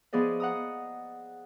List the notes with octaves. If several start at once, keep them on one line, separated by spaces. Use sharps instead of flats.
F3 B3 G#4 D5 D#5
F#5 A#5 D#6